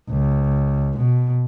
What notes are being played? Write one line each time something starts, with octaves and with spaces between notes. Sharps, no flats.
C#2
B2